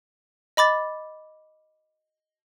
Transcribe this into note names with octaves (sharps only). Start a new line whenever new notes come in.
D#5 B5 D6 A6